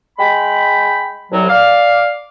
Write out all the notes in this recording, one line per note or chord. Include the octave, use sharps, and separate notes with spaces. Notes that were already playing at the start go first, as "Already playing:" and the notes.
G#3 G5 B5
C2 F#3
D5 F5